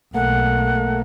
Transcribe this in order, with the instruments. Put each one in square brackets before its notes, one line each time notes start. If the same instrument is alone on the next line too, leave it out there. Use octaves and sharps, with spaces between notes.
[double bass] B1 [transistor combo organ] A3 A#3 [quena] F#5